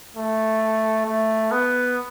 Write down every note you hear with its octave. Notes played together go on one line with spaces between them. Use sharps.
A3
A3
B3